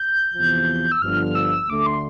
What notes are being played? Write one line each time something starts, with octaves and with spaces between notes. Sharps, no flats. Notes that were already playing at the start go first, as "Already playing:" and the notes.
Already playing: G6
E2 C3 F3
E6
G1 G2 D3 F3 F6
E6
D2 D3 A3 D6
C6